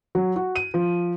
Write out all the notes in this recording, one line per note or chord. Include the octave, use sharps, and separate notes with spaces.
F#3
F#4
D#7
F3